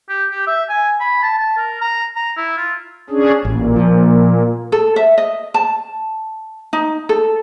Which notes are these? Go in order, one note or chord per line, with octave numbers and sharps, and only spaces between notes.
G4
G4
E5
G#5
B5
A5
A5
A#4
A#5
A#5
E4
F4
C#4 D4 G#4
A1 A#2
F3
A4
E5
D#5
A5
D#4
A4